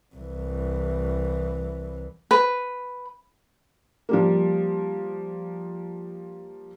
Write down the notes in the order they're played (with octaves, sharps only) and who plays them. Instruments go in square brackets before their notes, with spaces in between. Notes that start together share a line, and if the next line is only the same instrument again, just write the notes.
[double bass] C2 E3
[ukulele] B4
[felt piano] F3 G3 A#3